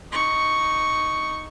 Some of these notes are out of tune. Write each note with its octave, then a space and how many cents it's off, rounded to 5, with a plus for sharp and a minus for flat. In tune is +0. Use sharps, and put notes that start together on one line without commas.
D#4 +0 C#6 +0